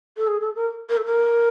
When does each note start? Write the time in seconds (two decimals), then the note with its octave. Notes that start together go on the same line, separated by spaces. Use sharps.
0.17 A4
0.27 G#4
0.41 A4
0.55 A#4
0.89 A#4
0.97 A4
1.05 A#4